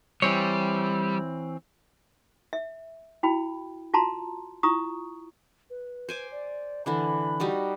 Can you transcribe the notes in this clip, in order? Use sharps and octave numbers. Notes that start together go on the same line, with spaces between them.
E3 G3 C4 C#5
E5
E4 F#4 G5 B5
F4 F#4 A5 A#5 C6
E4 F4 A#5 C#6 D#6
B4
C5 G#5 D6
D5
D3 E3 D4 B5
G3 D#4 F#4